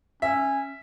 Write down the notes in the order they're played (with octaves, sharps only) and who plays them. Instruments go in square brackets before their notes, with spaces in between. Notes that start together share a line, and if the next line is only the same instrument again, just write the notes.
[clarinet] C#4 [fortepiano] E5